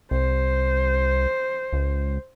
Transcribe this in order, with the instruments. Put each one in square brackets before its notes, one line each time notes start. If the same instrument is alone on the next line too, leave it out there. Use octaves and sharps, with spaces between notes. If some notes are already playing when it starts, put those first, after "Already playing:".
[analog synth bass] C2 [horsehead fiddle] C5
[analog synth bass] C#2